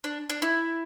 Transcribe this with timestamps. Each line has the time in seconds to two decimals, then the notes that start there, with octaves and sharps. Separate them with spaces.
0.04 D4
0.30 D4
0.42 E4